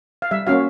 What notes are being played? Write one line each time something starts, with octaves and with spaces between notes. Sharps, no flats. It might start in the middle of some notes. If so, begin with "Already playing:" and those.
F5
G3 E5
A#3 C#4 F#4 F5